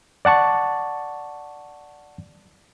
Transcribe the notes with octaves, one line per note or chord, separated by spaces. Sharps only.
D5 F#5 A5 C#6